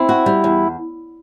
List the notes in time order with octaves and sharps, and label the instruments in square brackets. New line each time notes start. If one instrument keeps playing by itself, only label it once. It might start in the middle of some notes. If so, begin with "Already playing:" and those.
Already playing: [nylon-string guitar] C4 [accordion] E4
[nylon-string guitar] F#4
G3
E2